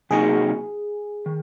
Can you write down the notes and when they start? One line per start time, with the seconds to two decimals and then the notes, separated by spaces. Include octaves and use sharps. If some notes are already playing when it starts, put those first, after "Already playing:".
0.11 C3 F#3 A#3 D#4 F#4 G#4
1.26 D#3